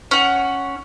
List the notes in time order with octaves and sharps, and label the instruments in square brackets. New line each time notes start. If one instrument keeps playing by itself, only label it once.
[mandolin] C#4 F#5